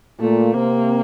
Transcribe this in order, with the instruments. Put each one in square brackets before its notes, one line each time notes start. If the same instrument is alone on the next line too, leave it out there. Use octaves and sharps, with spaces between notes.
[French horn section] A#2 A#3 [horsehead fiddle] A3
[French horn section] C3 C4 [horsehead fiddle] A#3